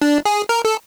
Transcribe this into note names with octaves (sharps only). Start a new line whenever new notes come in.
D4
G#4
A#4
A4